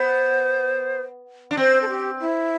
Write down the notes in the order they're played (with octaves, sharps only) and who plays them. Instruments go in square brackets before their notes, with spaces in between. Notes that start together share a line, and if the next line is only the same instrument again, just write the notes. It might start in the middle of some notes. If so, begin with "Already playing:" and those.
Already playing: [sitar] B3 [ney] C5
[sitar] D4
[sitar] C4 [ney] C5
[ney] A4
G4
E4